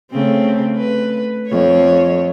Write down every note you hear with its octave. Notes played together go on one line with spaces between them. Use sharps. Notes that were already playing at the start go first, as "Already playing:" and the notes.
C#3 A3 C4
B4
F2 C#5